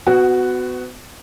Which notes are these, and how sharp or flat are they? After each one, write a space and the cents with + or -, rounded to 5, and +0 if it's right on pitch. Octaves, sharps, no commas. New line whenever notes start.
B3 +30 F#4 +0